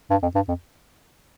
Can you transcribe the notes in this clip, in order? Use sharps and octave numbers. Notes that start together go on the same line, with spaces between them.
G2
F2
G2
F2